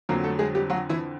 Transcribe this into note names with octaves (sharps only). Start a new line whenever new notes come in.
F2 D3 F#3 A#3 A#4
A3 A4
G#3 G#4
G3 G4
F#3 F#4
E3 E4